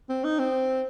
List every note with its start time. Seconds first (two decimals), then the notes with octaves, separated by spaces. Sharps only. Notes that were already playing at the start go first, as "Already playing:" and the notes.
0.09 C4
0.24 D#4
0.39 C4